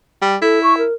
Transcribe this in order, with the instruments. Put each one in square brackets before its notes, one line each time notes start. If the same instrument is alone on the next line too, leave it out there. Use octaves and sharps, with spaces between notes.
[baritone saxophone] G3
[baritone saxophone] E4 [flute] A4
[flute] C#6
A#4